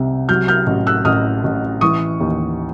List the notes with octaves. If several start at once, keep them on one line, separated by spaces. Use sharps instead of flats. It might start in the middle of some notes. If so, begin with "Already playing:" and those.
Already playing: C2 C3
F#3 F6 G6
F6 G6
A1
E6 F#6
A1 D#6 F6
A1
E3 C#6 D#6
D#2